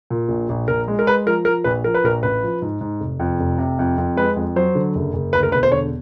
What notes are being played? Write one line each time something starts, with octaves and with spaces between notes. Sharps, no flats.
A#2
A#1
A#1
A#1 A#4
G#3
A#4
G#3 B4
F3 A#4
F3 A#4
A#1 B4
F3 A#4
B4
A#1 A#4
A1 B4
F3
G#2
G#2
F1
F2
F1
C3
F2
F2
G#3 B4
F2
F#3 C5
D3
F#1
F#1
D2 B4
A#4
E1 B4
C5
D3 C#5